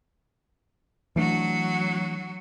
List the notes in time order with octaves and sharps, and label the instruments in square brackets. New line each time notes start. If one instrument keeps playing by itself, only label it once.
[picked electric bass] E3 A3 D4 [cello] F#3 F#4